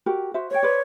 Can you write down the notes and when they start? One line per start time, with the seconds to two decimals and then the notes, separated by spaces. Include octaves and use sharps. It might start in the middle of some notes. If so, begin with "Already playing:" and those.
0.06 F#4 G4 A#4
0.34 F#4 C5 E5
0.51 C5 C#5 G5
0.63 B4 C5 D5